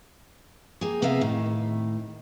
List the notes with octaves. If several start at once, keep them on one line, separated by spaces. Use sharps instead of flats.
A#3 G4 G#4
C3 A#3 B3 G#4 E5 F5
A2 D#3